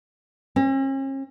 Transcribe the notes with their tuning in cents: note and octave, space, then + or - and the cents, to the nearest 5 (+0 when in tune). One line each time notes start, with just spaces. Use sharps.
C#4 -45